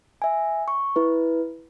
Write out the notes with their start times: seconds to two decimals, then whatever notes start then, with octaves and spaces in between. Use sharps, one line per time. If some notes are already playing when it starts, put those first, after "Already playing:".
0.22 E5 G#5
0.68 C#6
0.96 E4 B4